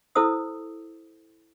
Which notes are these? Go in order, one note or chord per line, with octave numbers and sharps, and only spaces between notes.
E4 A4 C5 D#6 E6